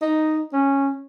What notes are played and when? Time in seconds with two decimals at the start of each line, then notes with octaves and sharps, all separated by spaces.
0.02 D#4
0.53 C#4